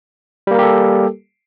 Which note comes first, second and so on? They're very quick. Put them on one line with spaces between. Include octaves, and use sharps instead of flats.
G3 A#3 A#4 G4 A4